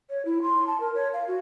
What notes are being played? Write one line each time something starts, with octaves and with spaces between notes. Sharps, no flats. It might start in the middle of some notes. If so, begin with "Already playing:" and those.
C#5
E4
C6
A5
A#4
C#5
F5
F#4